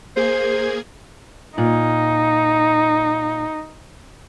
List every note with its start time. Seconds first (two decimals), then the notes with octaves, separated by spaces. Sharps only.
0.17 A#3 G#4 C5 G#6
1.58 A#2 D#4